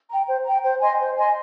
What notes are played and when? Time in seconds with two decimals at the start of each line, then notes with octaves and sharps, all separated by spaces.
0.09 G5 A#5
0.27 C5
0.46 G5 A#5
0.63 C5
0.81 D#5 G#5 C6
1.00 C5
1.18 D#5 G#5 C6